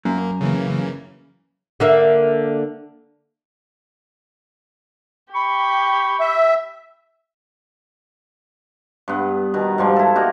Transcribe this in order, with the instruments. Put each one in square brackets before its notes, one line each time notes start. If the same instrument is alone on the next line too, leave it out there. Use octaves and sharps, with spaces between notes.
[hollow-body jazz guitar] F#2 [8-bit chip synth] A#3
[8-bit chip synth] C#3 E3 A#3
[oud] D3 A#3 E5
[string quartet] G4 [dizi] B5 [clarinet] C#6
[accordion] E5
[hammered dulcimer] G2 B3
B2 D#3
G#2 F3 G3
E4 A4
G3 A#3 D#4 F#4